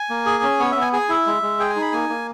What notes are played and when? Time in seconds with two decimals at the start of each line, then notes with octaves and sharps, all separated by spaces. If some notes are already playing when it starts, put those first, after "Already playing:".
Already playing: G#5
0.10 A#3
0.26 G#4
0.43 C#4
0.60 B3 C#5
0.71 B3 E5
0.82 G#5
0.93 G#4 G#5
1.09 E4 E5
1.27 G#3
1.42 G#3
1.60 G#4 G5
1.70 G#5
1.76 D#4
1.82 B5
1.92 A#3 G#5
2.09 A#3